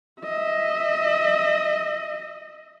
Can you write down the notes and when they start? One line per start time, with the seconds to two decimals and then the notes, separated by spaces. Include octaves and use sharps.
0.22 D#5 E5